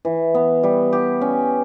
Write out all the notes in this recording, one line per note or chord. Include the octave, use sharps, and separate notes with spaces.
E3
B3
G3
G4
C#4